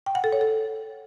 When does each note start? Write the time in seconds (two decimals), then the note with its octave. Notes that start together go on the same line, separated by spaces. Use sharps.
0.06 G5
0.15 F#5
0.24 A4
0.32 C#5
0.41 A4